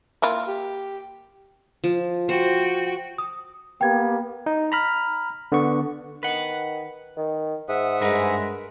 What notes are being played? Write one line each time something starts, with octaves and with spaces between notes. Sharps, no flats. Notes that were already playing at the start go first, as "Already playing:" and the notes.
A#3 E4 F4
G4
F3
F#4 C5 G5
D#6
A#3 B3 G4 G5 G#6
D#4
A#5 B5 F6
D3 B3 C#6
D#3 B4 F#5
D#3
G#2 E5 F#5 D#6
G2 G#3 A#4 B4